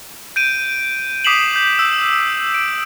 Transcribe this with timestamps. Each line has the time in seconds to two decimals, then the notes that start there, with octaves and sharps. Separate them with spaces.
0.36 G6 D7 D#7
1.24 D6 D#6 B6 C7 E7 F#7
1.56 G6
1.79 E6
2.54 D7